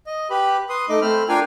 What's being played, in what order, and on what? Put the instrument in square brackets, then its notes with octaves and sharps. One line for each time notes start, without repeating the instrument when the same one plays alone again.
[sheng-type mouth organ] D#5
G4 B4 B5
B4 C6 D#6
A3 D#4 D#5 D6
A3 C4 C5 B5 F6
D4 F4 A#4 F5 G5 G#5